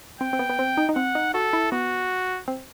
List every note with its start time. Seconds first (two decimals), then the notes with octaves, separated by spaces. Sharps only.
0.21 C4 G5
0.33 C4
0.39 B3
0.49 B3
0.59 C4
0.77 D#4
0.89 D#4
0.96 C4 F#5
1.15 D#4
1.34 F#4 A4
1.53 E4
1.72 B3 F#4
2.48 C4